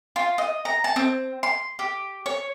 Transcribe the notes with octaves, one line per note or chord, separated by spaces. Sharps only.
F4
D#5
A#5
A5
C4
C6
G4
C#5